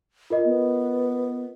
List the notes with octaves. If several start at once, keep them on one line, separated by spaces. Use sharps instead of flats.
F4 A#4 D#5
B3